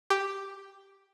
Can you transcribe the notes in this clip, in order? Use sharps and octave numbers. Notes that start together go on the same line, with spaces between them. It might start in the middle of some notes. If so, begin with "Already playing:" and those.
G4